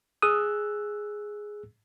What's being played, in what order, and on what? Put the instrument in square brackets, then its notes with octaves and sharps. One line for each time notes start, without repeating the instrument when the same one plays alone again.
[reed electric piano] G#4 E6 F#6 [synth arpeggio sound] D#6